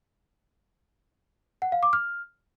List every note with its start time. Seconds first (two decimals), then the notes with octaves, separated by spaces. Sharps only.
1.62 F#5
1.72 F5
1.83 D6
1.93 F6